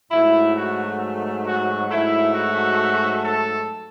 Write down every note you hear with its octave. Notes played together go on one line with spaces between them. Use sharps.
G#2 F#3 A3 E4
F#4
F#4
G#2 F#3 A3 E4
F#4
A4